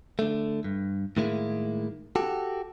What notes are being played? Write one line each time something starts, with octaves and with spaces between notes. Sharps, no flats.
D3 A3
G2
A2 D#3 G#3 A#3 E4
F#4 G4 A4